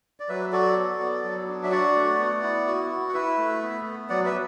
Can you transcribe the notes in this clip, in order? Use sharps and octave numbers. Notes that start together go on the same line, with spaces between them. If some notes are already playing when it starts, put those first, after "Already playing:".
D5
F#3 B4 E5
F#4 A4 D5
B3
B3
F#3
D4
E5
F#4 D5 F#5
A3
B3
E4
F#4
F#4
F#5
E4 B4 E5
A3
B3
B3
F#3 D5 F#5
B4 E5